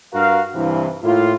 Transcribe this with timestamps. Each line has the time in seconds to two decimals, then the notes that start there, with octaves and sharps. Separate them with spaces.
0.13 G2 F#4 A#4 F5
0.55 G2 C3 E3
1.03 A2 A#3 E4 F4